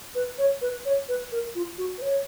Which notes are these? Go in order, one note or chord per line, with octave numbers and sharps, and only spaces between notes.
B4
C#5
B4
C#5
B4
A#4
F4
F#4
B4
C#5